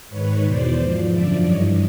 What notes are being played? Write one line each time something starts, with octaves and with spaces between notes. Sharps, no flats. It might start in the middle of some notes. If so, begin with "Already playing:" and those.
G#2 D#3 B4 C#5
E2 B2 C5 D5
G#2 F3
F#2 D3 F3 D5 E5
G2 E3 C#5 D#5